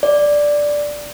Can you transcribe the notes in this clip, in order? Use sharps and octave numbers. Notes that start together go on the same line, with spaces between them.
D5